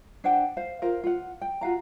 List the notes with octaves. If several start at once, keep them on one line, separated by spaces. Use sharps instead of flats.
D4 C5 F#5 G5
C5 F5
F4 A#4 C5 F5
F4 F#5
G5
F4 F#4 F5 A#5